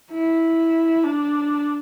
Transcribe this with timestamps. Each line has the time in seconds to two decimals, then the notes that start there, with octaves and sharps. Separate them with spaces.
0.11 E4
1.04 D4